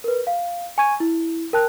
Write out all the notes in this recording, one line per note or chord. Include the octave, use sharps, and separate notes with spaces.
A#4 B4
F5
G#5 C#6 G#6 D#7
E4
A#4 G5 A5 F#6